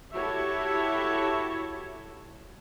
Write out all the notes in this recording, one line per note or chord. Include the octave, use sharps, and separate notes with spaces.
E4 F#4 G4 A4 C#5 E5